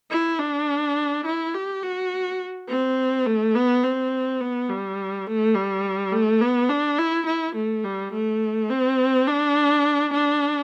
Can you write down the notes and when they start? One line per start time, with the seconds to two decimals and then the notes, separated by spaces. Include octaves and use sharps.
0.11 E4
0.39 D4
1.26 E4
1.54 G4
1.83 F#4
2.69 C4
3.26 A3
3.55 B3
3.83 C4
4.41 B3
4.69 G3
5.27 A3
5.55 G3
6.12 A3
6.41 B3
6.70 D4
6.98 E4
7.27 E4
7.56 A3
7.84 G3
8.13 A3
8.70 C4
9.28 D4
10.14 D4